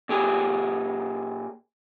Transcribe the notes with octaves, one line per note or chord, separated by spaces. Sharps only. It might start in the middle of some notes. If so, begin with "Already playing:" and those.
A#2 G4 G#4